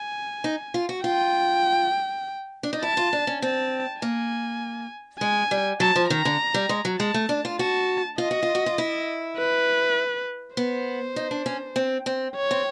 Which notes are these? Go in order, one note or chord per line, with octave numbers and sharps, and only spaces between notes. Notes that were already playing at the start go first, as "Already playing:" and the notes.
Already playing: G#5
D#4
F4
F#4
F4 G5
D4
D#4
E4 A5
F4
D4
C#4
C4 A5
A#3 G#5
G#3 G#5
G3
F#3 A5
F3
D#3 A#5
D3
G3
G#3
F#3
G#3 A5
A3
D4
F4
F#4 A5
F4 D#5
F#4
F4
F#4
F4
E4
B4
B3 C5
D#4
D4
C#4
C4
C4
C#5
C4